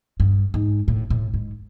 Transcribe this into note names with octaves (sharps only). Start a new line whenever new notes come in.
G2
G#2
A2
A2
G#2